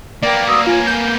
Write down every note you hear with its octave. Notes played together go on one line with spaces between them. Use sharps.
A#3 B3 A#4 D5 G5
F#4 D#6 E6
F4 C#5 G#5
G#5 G6